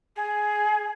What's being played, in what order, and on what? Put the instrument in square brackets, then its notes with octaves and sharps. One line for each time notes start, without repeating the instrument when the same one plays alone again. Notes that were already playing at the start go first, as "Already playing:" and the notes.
[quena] G#4